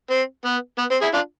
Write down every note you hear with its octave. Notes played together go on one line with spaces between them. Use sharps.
C4
B3
B3
C4
E4 G#4
D4 F4